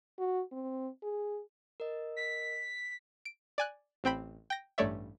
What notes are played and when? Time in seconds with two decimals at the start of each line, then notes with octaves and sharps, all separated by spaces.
0.19 F#4
0.52 C4
1.03 G#4
1.80 A#4 D#5
2.17 B6
3.25 D7
3.58 D5 G#5 F#6
4.04 A1 C4 G5 B5
4.50 G5 A#6
4.78 A1 G2 A3 C#5 D5 E5